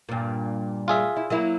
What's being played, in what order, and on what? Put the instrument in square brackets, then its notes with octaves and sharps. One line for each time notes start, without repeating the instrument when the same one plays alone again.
[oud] G2 A#2
[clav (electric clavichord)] F4 G#4 E5
[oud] E4
F#3 A#3 E4